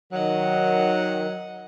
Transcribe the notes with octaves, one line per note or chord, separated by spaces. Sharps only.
D#3 F#3 D#5 F#5